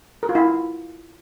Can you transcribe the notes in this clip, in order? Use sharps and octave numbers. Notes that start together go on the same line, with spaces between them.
A#4
F4
E4